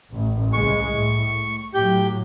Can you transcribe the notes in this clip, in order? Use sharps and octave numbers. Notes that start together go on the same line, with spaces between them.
A1
C2 C#3 G#3 C#6
A2
A2 F#3 G4 G6